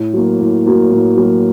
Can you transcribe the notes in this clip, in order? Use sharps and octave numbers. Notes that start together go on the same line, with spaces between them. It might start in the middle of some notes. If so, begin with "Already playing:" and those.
Already playing: A2
F#3 A#3
A2
F#3 A#3
A2
F#3 A#3